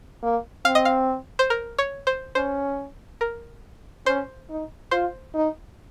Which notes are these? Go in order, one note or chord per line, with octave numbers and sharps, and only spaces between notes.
A#3
C4 F5
D#5
F5
C5
A#4
C#5
C5
C#4 C5
A#4
C#4 C5
D#4
F4 C5
D#4